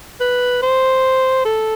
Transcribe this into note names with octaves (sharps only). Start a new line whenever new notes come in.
B4
C5
A4